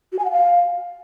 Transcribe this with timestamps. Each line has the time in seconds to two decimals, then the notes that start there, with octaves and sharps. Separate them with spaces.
0.12 F#4
0.19 G#5
0.25 F#5
0.31 F5